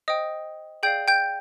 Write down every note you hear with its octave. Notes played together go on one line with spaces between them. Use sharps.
C5 D#5 G5 D#6
G#4 D5 F5 G5 G6
G5 G6